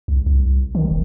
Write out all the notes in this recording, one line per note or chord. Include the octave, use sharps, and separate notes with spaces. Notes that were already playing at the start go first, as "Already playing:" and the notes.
C2
C2
D#3
E1